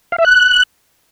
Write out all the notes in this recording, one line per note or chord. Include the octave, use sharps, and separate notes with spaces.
F5
E5
F#6